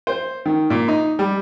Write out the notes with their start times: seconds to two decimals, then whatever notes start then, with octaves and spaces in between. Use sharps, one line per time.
0.07 C5
0.46 D#3
0.70 A#2
0.88 D#4
1.19 G3